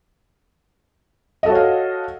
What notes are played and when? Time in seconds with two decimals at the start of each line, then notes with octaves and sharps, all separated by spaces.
1.43 D#5
1.46 A4
1.49 F#4
1.52 C#5
1.55 F5